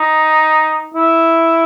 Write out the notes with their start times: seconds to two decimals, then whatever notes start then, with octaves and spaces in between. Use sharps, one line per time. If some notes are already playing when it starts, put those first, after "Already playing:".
Already playing: D#4
0.94 E4